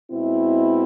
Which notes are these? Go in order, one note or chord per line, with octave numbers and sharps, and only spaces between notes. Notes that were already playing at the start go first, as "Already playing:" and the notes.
B2 G#3 C4 E4